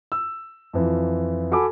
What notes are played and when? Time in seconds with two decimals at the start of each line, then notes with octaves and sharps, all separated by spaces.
0.12 E6
0.73 F2 E3 F4
1.52 F#4 A4 G#5 A5 B5 D6